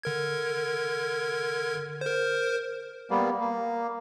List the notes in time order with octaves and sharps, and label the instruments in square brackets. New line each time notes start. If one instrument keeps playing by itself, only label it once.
[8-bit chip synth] D3 A#4 G#6
A#4 C5
[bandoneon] G3 A#3 B3
A#3